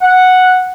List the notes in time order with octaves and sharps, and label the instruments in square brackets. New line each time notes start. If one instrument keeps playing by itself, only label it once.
[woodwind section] F#5